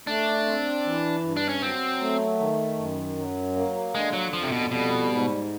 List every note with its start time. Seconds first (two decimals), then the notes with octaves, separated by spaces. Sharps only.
0.07 A3 D4
0.46 C4
0.85 E3
1.24 G2
1.37 D4
1.49 C#4
1.62 F#3 C4
2.01 A3
2.39 D#3
2.78 F#2
3.18 F#3
3.56 A#3
3.94 D3 G#3
4.13 F#3
4.33 F2 F3
4.43 C3
4.52 B2
4.71 B2 G3
5.10 G#2